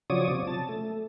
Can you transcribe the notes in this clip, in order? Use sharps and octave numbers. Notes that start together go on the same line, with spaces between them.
C#3 F3 F#3 C#5 D5 D#6
C3 F3
A5
A3